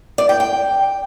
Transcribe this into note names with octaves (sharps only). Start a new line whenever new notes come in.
D5
G5
G5